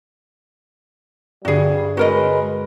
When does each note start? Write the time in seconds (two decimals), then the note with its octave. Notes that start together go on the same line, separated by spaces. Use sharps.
1.45 G2 D3 G3 D4 F#4 G#4
1.97 G#3 F#4 A#4 B4 D#5 C#7